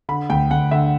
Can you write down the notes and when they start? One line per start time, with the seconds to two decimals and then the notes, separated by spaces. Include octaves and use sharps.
0.09 D3 B5
0.30 D2 G5
0.51 D2 F#5
0.71 D3 E5